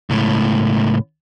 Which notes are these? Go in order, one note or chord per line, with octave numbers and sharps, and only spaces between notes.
C#2 A2